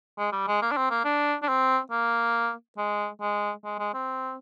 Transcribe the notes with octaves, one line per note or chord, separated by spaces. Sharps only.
G#3
G3
G#3
A#3
D4
C4
A#3
D4
D4
C4
A#3
G#3
G#3
G#3
G#3
C4